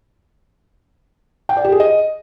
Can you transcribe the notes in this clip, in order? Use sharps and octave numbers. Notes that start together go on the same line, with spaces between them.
G5
D5
G4
G#4
D#5